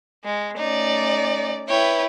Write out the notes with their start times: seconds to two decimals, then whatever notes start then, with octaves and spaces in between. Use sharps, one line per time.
0.24 G#3
0.57 A3 C#4 D#4 D5
1.69 E4 B4 C#5 G5